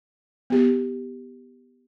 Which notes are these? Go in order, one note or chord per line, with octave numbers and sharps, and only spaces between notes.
B3 G4